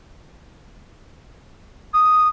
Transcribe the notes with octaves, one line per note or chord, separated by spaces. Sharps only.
D#6